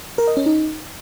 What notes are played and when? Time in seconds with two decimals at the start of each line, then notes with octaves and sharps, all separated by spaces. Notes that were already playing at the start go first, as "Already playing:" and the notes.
0.18 A#4
0.27 D#5
0.37 C#4
0.46 D#4